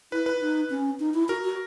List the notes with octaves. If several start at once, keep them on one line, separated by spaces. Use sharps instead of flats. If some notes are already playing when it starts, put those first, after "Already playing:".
E4 B4
B4
D#4
C#4
D#4
E4
F#4 A#4
F#4